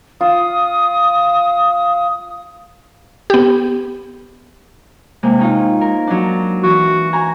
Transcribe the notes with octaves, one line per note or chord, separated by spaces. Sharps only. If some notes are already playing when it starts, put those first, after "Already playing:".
F4 D#6
B3 G4
C3 G#3 A#3
C#4 D#4 F4
A#4
F#3 D4
E3 F#4
G#5 A#5